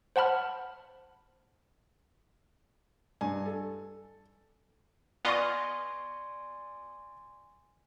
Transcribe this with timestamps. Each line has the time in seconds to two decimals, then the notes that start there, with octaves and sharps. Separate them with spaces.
0.16 C5 F#5 A5 B5 F6
3.21 G2 G#5
3.46 A4
5.25 B3 F4 D5 D#5 G#5 C6 C#6